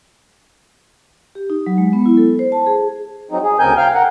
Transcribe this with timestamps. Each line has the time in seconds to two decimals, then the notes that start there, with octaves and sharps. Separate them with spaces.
1.35 G4
1.50 D#4
1.66 F#3
1.78 G#3
1.93 B3
2.06 E4
2.17 A4
2.39 C5
2.52 A5
2.66 G#4
3.31 F#3 C4 D#4
3.43 G#4
3.59 D2 C#3 C4 A#4 G#5 G6
3.77 F5 G5 F6
3.94 A#4 F#5